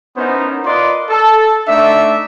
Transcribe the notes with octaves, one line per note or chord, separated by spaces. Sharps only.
B3 C#4 D#4 E4 A#4 C5
F4 A#4 B4 D5 D#5 C6
A4
A3 D4 D#4 D5 E5